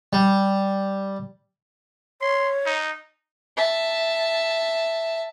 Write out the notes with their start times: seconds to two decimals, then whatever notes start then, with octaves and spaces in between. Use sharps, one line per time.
0.13 G3
2.21 C#5 C6
2.66 D#4
3.57 E5 A5